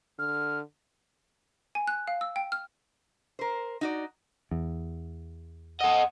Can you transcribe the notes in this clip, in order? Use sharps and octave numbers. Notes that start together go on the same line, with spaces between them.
D3 F6
G#5
F#6
F5
E6
G5
F6
A#4 C5
D#4 F#4 D5
E2
A4 D#5 F#5